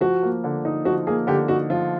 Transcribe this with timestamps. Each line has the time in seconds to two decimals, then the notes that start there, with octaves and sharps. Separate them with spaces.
0.01 F3 F#4
0.23 A#3
0.44 D3
0.65 D#4
0.85 F3 F#4
1.07 A#3 G#4
1.27 D3 G4
1.48 D#4 F#4
1.70 F3 F4